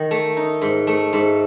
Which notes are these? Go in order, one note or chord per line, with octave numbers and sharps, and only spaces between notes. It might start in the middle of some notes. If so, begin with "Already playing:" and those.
Already playing: D#3 D#4
A3
D#4
G#2
A3
G#2